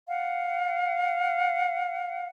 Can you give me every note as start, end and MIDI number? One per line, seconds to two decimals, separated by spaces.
0.08 2.28 77
0.08 2.28 78